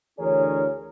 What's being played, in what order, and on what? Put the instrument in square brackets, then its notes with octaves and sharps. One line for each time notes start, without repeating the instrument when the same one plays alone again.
[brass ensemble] D2 E3 D4 G#4 A#4 C#5